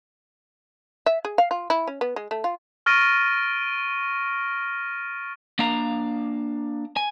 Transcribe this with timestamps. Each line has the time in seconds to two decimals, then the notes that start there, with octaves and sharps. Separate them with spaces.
1.06 E5
1.25 G#4
1.38 F5
1.51 F4
1.70 E4
1.87 C#4
2.01 B3
2.16 G#3
2.31 A3
2.44 F4
2.86 C#6 F6 A6 A#6 D7 D#7
5.59 A#3 D4 F5 A#5
6.97 G#5